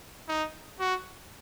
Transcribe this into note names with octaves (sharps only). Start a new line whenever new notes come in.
D#4
F#4